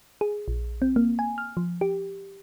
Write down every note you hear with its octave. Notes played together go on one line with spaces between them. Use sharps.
G#4
A#1
C4
A#3
G#5
F6
F3
G4